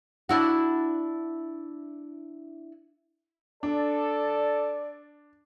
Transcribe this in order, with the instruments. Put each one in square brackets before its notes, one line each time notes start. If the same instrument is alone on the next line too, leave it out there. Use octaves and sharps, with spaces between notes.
[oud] D4 E4 F#4
[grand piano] D4 [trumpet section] A4 [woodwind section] D5